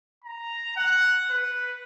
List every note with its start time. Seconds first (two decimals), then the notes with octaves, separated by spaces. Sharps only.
0.24 A#5
0.77 F#5
1.31 B4